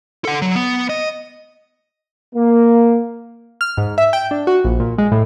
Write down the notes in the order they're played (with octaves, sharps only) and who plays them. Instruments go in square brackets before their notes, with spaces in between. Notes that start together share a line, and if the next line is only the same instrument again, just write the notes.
[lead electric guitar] A4 F#5
F#3
B3
D#5
[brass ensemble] A#3
[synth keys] F6
G#2
E5
G5
D4
F#4
A#1
A#2
G#3
A2